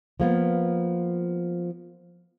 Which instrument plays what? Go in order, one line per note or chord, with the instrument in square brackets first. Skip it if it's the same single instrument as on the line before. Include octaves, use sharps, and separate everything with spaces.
[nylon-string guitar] F3 A#3 B3